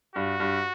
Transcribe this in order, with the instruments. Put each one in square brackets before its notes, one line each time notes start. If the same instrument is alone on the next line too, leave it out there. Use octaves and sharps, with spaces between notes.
[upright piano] G2 [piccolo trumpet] F#4
[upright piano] G2